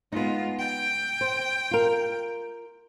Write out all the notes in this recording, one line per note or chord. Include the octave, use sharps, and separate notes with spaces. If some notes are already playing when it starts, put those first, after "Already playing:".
G#3 B3 D#4 F4
G5
C5
F4 A#4